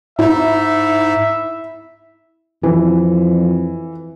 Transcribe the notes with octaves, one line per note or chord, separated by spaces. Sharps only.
G#2 D#4 E4 E5
F2 E3